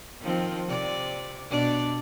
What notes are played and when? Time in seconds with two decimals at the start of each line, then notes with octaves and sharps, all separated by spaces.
0.21 D#3 F3 C4
0.68 C3 D5
1.50 B2 D4 D5